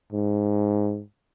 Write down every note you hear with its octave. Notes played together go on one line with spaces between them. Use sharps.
G#2